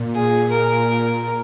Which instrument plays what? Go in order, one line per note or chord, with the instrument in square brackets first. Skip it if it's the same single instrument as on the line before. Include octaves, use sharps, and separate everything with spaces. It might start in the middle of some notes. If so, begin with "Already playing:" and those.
Already playing: [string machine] A#2
[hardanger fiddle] G#4
A#4